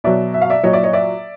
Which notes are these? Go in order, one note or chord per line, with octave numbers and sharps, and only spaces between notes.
B2 F#3 D5 E5
E5
F5
D5 E5
A#2 F#3 C#5 D#5
D5 E5
C#5 D#5
D5 E5